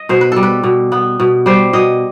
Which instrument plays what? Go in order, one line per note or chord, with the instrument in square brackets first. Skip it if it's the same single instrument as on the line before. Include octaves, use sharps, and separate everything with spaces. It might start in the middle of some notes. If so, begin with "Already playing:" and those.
Already playing: [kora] D#5
B2 C5
B4
G3 A4
B4
B2
B3
B2
G3 C5
B2 D#5